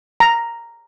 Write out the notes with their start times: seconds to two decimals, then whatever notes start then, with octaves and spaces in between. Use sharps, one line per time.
0.20 A#5